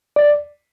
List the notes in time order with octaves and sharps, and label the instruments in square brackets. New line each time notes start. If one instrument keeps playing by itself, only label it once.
[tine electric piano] D5